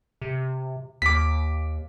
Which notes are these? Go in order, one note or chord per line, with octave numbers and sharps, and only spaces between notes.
C3
D#2 D6 B6